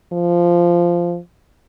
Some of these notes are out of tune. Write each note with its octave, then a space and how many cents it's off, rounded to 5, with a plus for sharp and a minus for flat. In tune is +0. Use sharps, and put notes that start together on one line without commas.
F3 -10